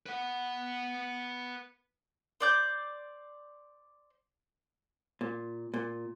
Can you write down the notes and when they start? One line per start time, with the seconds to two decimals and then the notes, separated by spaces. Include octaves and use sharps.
0.06 B4 F#5
2.40 C5 D5 G6
5.21 A#2
5.74 A#2